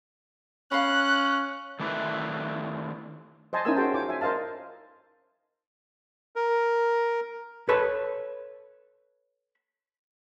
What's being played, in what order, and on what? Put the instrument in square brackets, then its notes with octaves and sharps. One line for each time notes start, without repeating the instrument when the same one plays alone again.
[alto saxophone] C#4 [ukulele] F5 B5 [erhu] F#6
[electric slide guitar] D#3 A3 D4 E4 B4 E5
[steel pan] C5 D#5 G#5 A5
C#4 D#4 E4 A#4 G#5 E6
F#4 G#4 C5 G5 A5
F4 C#5 G#5 D6
E5 G#5
A#4 C5 D#5 F5 A5
[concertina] A#4
[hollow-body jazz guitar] A4 B4 C#5 A5 B5